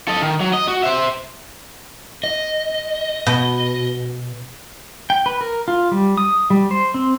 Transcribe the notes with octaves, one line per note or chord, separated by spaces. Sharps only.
A4 D#5
D#3
F#3
D#5
F#4
C5 E5
D#5
B2
G5
B4
A#4
F4
G3
D#6
G3
C5
C4